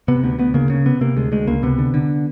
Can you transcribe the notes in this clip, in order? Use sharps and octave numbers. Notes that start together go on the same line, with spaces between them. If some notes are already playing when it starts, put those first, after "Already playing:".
C3 B3
D2 B3
D2 B3
C#3 A#3
C#3
C3 B3
C3 A#3
D2 G#3
D2 G#3
C#2 A#3
C3 B3
D3
D3